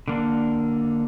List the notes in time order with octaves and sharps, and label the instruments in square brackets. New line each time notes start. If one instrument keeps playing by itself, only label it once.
[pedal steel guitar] D3 A#3 D4